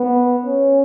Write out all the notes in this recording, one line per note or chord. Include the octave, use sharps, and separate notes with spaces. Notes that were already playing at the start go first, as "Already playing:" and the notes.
Already playing: B3
C#4